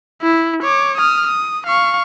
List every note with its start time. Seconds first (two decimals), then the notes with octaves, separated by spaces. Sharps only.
0.22 E4
0.63 C#5 D6
0.98 D#6 F6
1.27 D#6
1.67 F5 C#6